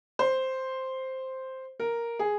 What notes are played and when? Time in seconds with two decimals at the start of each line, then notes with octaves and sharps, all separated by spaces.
0.19 C5
1.80 A#4
2.19 G#4